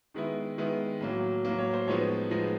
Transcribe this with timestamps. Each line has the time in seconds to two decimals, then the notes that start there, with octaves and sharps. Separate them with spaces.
0.14 D#3 G#3 B3 E4
0.58 D#3 G#3 B3 E4
1.01 A2 F#3 A#3
1.45 A2 F#3 A#3
1.58 C#5
1.73 C5
1.87 A2 F3 G#3 B3 D#4 C#5
2.31 A2 F3 G#3 B3 D#4